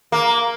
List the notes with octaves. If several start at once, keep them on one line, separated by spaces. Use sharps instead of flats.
A#3